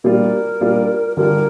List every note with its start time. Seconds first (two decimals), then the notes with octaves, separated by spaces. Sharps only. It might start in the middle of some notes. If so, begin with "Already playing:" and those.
0.04 A#2 G3 D4 F4 A#4
0.61 A#2 G3 D4 F4
1.17 D3 G3 D4 F4 A#4